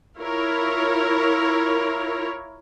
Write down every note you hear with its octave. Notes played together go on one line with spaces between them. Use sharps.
E4 F4 A#4 C#5